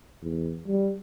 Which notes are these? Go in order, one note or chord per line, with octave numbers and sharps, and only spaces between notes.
E2
G3